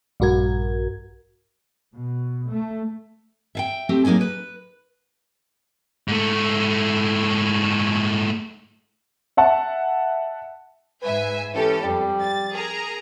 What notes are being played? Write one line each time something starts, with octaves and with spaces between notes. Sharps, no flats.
A#1 G2 F#4 A#4 G#6
B2
A3
E5 F5 G5
A3 C4 G4
F#3 A#3 D#4 G#4 D5
B4
G#2 A3
E5 F#5 A5
G#2 B4 E5 G#5
E3 C#4 G4 A4
F2 G3
A6
G#4 A#4 A#5